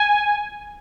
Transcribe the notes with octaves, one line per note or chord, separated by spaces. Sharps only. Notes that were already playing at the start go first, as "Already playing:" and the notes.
Already playing: G#5